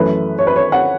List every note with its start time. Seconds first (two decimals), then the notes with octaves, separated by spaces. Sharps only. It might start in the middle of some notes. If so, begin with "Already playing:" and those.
Already playing: F#2 E3 A3 B4
0.38 C#5
0.47 B4
0.56 C#5
0.72 F#5